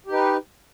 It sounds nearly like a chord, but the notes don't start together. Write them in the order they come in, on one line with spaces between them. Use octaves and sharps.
G4 D#4 B4